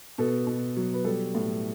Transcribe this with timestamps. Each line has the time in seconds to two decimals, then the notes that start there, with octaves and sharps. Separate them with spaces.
0.18 B2 A4
0.47 B2
0.76 F#3
0.94 B4
1.05 G3 A4
1.35 A2